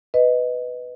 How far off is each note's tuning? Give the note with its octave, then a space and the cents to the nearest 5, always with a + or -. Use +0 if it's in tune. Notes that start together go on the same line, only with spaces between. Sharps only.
B4 +10 D#5 +0